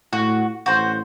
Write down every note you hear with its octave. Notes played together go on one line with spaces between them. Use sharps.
A2 F#4
A1 F#4 C5